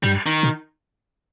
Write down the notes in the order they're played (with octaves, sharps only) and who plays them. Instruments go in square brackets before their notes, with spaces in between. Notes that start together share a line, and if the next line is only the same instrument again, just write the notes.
[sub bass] G2 [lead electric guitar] G3
[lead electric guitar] D#3
[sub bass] B2